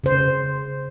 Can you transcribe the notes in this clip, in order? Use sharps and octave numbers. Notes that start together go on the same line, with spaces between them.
C#3 C5